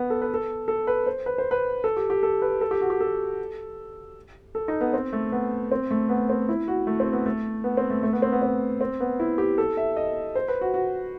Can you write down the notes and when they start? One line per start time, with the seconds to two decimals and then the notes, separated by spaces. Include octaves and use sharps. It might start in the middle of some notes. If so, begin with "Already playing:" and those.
Already playing: B3
0.10 A4
0.22 B4
0.34 A4
0.68 A4
0.87 B4
1.06 C5
1.26 B4
1.38 C5
1.51 B4
1.84 A4
1.97 G4
2.10 G4
2.23 A4
2.42 B4
2.61 A4
2.71 G4
2.81 F#4
2.90 G4
3.00 A4
4.55 A4
4.68 D#4
4.81 B3
4.93 C4
5.13 A3
5.32 B3
5.72 C4
5.91 A3
6.09 B3
6.29 C4
6.49 E4
6.68 F#4
6.87 A3
7.00 C4
7.13 B3
7.26 A3
7.64 B3
7.77 C4
7.90 A3
8.03 A3
8.13 B3
8.22 C4
8.32 B3
8.42 C4
8.81 C4
9.00 B3
9.20 E4
9.38 G4
9.58 A4
9.77 E5
9.97 D#5
10.35 C5
10.48 B4
10.61 F#4
10.74 F#4